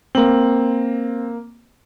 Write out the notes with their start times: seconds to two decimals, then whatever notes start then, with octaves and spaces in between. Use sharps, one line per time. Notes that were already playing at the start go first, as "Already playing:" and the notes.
0.15 A#3 C4 F#7